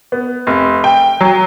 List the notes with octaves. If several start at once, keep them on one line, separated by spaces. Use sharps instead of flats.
B3
F1
G5
F#3